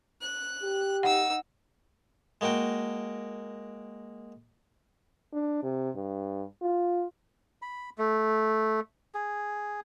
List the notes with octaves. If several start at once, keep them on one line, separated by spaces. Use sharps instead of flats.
F#6
G4
D#4 F#5 E6
G#3 A#3 F#4 G5
D4
C3
G2
F4
B5
A3
G#4